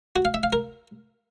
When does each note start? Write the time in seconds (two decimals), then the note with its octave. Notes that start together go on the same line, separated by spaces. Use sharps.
0.16 F#4
0.25 F5
0.34 E5
0.43 F5
0.53 A#4